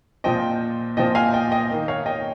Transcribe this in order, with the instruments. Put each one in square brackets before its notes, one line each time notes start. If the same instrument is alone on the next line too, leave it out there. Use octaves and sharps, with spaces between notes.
[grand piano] A#2 F3 C4 D#5 G5
A#2 F3 C4 D#5 G5
F5 G#5
D#5 G5
D#5 G5
D#3 A#3
C#5 F5
D#5 G5